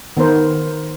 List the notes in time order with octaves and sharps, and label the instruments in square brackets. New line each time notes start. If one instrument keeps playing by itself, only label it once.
[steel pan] D#3 B3 A#4 C5